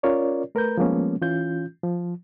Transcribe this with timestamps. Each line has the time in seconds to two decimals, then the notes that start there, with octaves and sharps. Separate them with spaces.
0.03 C#4 F4 A#4 C#5 D5
0.55 A3 A#4 B4 A#5 G6
0.78 F3 G3 G#3 A#3 B3 C#4
1.22 E3 C#4 F4 G6
1.83 F3